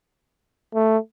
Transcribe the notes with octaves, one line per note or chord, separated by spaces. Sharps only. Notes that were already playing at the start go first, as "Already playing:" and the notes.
A3